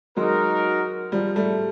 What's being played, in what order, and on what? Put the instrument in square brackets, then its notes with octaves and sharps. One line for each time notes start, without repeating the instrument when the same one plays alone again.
[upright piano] F#3 G#3 [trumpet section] D#4 F#4 A#4
[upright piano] F3 G3
G3 A3